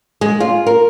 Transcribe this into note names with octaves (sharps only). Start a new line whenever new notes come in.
G#3
F4
A#4